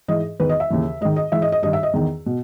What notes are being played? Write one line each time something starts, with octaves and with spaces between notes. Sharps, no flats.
G#2 E3 D#5
E2 D#3 B4
D#5
E5
D#2 C#3 E3
G#2 D#3 D#5
D#5
G#2 E3 E5
D#5
D#5
G2 D#3 D#5
E5
D#5
E2 D#3
B2